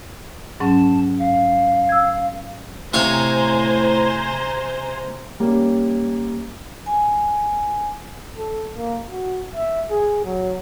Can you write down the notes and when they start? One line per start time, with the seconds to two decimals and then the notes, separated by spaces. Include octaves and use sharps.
0.60 G#2 F#3 C#4 A5
1.18 F5
1.89 E6 G#6
2.94 A2 C3 C5 C#5 F5 G#5 A#5
5.40 G3 A#3 C#4
6.86 G#5
8.38 A4
8.74 A#3
9.11 F#4
9.55 E5
9.90 G#4
10.24 F#3